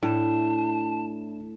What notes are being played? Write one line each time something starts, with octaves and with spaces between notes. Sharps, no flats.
A2 D4 E4 A5